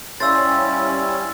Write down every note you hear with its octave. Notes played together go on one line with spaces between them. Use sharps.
G3 C#4 E4 C5 E5 F5 E6 A6